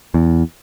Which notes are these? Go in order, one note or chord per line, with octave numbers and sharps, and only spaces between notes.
E2